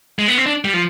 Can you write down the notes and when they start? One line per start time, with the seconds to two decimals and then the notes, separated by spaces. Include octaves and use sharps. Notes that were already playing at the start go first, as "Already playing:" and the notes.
0.19 G#3
0.28 B3
0.38 C4
0.46 D4
0.65 G3
0.74 F3